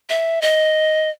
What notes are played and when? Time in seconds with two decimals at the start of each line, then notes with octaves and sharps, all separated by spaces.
0.09 E5
0.42 D#5